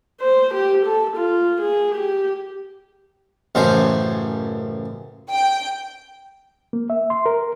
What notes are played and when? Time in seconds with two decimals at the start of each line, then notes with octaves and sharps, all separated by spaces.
0.21 C5
0.54 G4
0.86 A4
1.17 F4
1.61 G#4
1.95 G4
3.55 A1 F#2 C#3 C5
5.30 G5
6.73 A#3
6.90 E5
7.10 C6
7.26 A#4